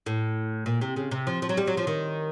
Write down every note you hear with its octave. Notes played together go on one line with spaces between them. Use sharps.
A2
A#2
C3
C#3
C3
F3
F3
F#3
G3
F#3
F3
D#3